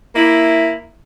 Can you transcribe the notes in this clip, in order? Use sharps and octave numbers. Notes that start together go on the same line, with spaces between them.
A#3 E4